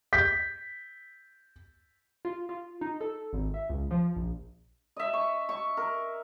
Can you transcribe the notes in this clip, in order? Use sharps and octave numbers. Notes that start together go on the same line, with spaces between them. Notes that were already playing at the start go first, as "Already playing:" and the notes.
G6 B6
F4
F4
D#4
A4
G#1
E5
C#2
F3
A#1
D#5 E5
C#6
C#6
A#4